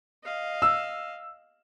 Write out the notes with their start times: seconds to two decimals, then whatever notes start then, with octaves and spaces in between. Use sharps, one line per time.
0.23 D#5 F5
0.62 E6